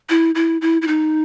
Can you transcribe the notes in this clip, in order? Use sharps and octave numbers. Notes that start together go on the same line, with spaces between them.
E4
E4
E4
E4
D#4